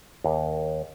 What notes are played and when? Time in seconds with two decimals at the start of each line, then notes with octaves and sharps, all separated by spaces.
0.24 D#2